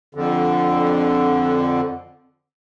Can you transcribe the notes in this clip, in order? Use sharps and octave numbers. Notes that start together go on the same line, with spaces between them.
F2 D3